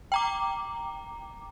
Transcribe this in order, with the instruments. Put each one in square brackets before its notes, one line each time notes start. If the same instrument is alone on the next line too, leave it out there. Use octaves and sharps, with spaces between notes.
[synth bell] G5 A#5 D6